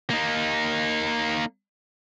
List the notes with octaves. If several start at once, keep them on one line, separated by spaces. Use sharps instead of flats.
A#3 D#4